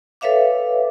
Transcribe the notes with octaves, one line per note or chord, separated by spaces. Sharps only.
A4 B4 C#5 E5 F5 D6